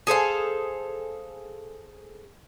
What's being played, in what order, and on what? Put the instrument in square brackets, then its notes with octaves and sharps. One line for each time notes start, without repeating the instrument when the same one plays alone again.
[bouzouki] G#4 A4 C5 F5